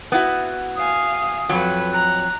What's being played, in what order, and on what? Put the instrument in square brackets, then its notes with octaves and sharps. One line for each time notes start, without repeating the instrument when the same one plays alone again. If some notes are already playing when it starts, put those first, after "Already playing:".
[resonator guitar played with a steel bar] B3 E4 F#4
[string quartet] F5 G#5 [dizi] D#6
[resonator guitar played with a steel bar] F2 F#3 [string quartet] A4 B4
[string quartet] A#5 [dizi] F#6